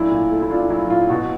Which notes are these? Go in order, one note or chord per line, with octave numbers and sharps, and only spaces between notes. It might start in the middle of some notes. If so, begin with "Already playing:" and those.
Already playing: A#2 F#3 A3 D4 E4
A#2
A3
E4
D4 F4
F#3 E4
A#2 F4
B2 F#4